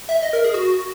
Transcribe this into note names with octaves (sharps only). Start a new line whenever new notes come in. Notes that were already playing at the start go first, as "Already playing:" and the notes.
E5
D#5
A#4
G#4
F#4